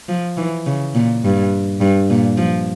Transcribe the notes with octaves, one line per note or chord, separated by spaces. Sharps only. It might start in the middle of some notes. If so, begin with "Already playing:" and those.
F3
E3
C#3
A#2
G2
G2
A#2
F3